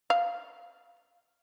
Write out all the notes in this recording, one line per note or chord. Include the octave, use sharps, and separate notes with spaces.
F5